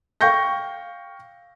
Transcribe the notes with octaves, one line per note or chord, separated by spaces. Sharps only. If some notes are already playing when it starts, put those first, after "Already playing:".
F5 G5 C#6 G6 A#6